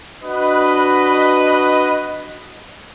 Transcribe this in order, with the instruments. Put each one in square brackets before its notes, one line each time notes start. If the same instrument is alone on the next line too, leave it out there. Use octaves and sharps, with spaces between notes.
[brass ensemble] D4 F#4 B4 D#5